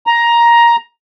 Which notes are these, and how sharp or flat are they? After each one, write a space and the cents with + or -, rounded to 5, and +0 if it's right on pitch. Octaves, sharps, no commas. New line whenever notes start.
A#5 +10